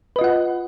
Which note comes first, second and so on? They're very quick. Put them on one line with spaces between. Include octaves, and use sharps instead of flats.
B4 D#5 F4 F#5